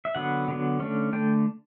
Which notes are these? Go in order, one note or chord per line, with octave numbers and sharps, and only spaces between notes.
E5
D3 F#3 B3 F#5
D3 F#3 B3
D3 A3 C#4
D3 A3 G5